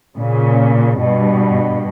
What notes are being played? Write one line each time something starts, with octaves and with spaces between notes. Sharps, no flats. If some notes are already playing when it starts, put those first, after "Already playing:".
A#2 C#3
G2 B2